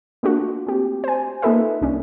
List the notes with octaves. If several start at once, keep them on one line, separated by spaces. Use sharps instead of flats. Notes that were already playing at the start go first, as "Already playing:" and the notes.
A3 A#3 D4 F4 F#4
C4 G4
C5 G#5
A#3 D#4 F4 A4 B4 E5
C2 C#4 D4